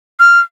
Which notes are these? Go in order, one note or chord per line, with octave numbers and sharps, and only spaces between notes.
F6